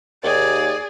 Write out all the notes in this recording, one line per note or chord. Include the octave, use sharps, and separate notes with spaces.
D#2 G#4 D5